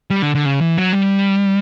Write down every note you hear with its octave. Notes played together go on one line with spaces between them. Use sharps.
G3
D3
D3
C#3
E3
F#3
G3